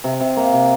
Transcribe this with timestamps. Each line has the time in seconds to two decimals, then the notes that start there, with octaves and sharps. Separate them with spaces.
0.04 C3
0.20 C3
0.37 A#3
0.53 C3